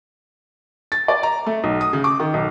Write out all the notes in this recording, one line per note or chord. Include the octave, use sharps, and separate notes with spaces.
A6
D5
A#5
A3
B1
D#6
C#3
D6
D#3
B1